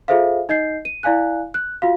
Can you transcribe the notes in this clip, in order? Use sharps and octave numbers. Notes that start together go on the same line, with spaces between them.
F4 G#4 A4 C5 E5 F5
D#4 D#5 G6 C7
D#7
E4 D5 F5 G#5 F#6
F#6
F4 F#4 F5